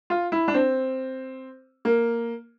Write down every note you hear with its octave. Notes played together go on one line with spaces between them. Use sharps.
F4
E4
D4
C4
A#3